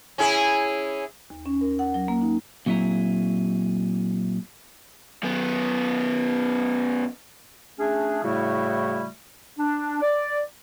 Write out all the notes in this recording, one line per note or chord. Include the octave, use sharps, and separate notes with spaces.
C#4 E4 G#4
D#2
C#4
A#4
F#5
F#3
A#3
D#4
A#2 F#3 C4 E4 G#4 A#5
F#2 B3
A3 C#4 D4 G#4
A2 C#3 G3 A3 E4 F#4
D4
D5